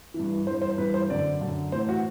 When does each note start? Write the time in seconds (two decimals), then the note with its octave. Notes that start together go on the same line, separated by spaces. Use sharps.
0.14 E3
0.19 G2
0.47 E3 C5
0.50 G2
0.61 C5
0.78 G2 E3 B4
0.94 C5
1.09 F#2 D3 D5
1.41 F#2 D3
1.72 A2 E3 C5
1.89 F#4